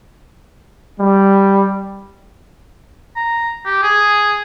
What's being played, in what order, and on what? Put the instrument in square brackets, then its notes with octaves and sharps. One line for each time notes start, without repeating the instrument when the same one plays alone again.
[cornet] G3
[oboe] A#5
G4
G#4